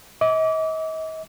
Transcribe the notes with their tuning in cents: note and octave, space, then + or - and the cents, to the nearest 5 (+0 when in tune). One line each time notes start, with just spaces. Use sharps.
D#5 +40 D6 -25